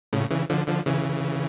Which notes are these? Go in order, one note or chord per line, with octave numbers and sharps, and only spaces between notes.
A2 C#3
C#3 E3
D3 F3
D3 F3
C#3 E3